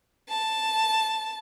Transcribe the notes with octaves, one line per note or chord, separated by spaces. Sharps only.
A5